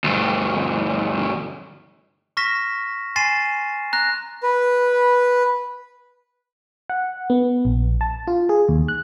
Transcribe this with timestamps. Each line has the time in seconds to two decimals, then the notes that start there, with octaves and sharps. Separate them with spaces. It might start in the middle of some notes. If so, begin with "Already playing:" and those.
0.04 D2 G2
2.37 C#6 F6 A#6 B6 E7
3.16 G#5 C6 A6 C7 D#7 E7
3.93 A#5 F#6 A#6
4.43 B4
6.90 F#5
7.30 B3
7.65 A#1
8.01 A5
8.27 F4
8.49 G#4
8.69 D#2
8.88 F#6